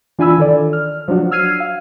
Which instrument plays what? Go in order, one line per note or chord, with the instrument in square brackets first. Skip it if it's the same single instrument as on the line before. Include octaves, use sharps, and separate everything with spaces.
[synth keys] E3 D4 F4 G#5 B5 E6
D#3 A4 D5
F6
F3 F#3 D4 F#4
E6 F6 G#6 C7 D#7
F5